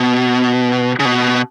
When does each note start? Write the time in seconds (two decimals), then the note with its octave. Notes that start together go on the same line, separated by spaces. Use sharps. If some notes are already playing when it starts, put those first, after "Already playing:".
Already playing: B2
0.99 C#3
1.05 B2